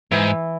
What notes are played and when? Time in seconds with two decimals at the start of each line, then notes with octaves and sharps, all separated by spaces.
0.11 G#2 E3